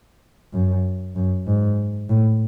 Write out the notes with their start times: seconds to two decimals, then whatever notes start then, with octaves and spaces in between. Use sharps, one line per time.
0.53 F#2
1.16 F#2
1.47 G#2
2.09 A2